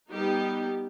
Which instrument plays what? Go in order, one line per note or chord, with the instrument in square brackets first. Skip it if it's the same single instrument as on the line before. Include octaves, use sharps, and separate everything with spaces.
[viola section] G3 B3 D#4 G4